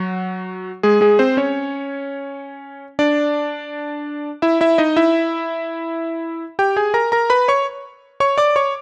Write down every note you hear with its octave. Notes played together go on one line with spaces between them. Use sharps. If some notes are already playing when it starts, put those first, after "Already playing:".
Already playing: F#3 F#4
G#3 G#4
G#3 G#4
C4 C5
C#4 C#5
D4 D5
E4 E5
E4 E5
D#4 D#5
E4 E5
G4 G5
G#4 G#5
A#4 A#5
A#4 A#5
B4 B5
C#5 C#6
C#5 C#6
D5 D6
C#5 C#6